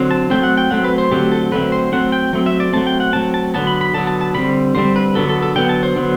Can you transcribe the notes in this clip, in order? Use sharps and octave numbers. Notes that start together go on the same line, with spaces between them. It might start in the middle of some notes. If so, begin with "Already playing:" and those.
Already playing: D3 F#3 C4
A5
F#3 A3 C4 G5
F#5
G5
F#3 A3 C4 F#5
B4
C5
D3 F#3 A3 C4 G4
A4
D3 F#3 A3 C4 B4
C5
F#3 A3 C4 F#5
G5
F#3 A3 C4
E5
D5
F#3 A3 C4 A5
G5
F#5
F#3 A3 C4 A5
A5
D3 F#3 B3 A5
B5
B5
D3 F#3 B3 A5
A5
A5
D3 G3 C4 B5
D3 G3 C4 C5
B4
D3 F#3 B3 A4
A4
A4
D3 F#3 B3 G5
A5
C5
D3 F#3 B3